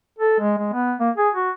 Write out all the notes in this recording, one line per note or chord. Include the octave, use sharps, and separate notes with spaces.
A4
G#3
G#3
B3
A#3
G#4
F#4